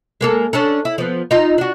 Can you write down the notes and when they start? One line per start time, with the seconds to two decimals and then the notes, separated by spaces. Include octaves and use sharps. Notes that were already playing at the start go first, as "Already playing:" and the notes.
0.21 G#3 A#3 A4
0.53 C#4 D4 A4
0.85 E4
0.98 F3 B3
1.31 D#4 F4
1.58 D4 F#4